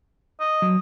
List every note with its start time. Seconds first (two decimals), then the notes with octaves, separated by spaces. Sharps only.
0.40 D#5
0.62 F#3